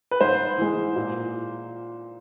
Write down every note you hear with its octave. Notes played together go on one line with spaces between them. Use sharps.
B4
G#2 C5
E3 G#3
A#2